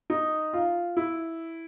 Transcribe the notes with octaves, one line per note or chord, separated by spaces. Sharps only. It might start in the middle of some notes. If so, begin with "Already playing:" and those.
D#4
F4
E4